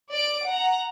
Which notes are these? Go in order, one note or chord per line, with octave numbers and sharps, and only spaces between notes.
D5 D7
F#5 A#5